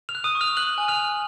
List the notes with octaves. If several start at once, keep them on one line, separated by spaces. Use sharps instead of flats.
F6 F7
F#6
D#6 D#7
C#6
F6 F7
F#6 F#7
G#5
F6 F7
F#6